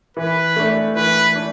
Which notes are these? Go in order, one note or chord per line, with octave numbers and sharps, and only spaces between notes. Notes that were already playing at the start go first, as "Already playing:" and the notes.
E3 B4
A3 D4
E3 B4
D4